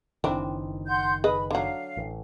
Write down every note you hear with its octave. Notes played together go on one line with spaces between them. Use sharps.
F#1 D#3 E3 C4 D4
F#5 C6 G6
G#4 B4 D#5 B5
D3 F#3 F5
A1